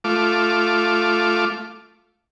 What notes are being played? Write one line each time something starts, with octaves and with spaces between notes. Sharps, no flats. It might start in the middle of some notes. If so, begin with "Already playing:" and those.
A3 F4 D6